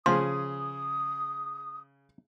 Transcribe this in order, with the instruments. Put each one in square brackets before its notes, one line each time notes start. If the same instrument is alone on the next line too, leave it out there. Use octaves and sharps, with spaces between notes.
[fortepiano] C#3 G#4 [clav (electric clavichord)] F3 [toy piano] C6 [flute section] D#6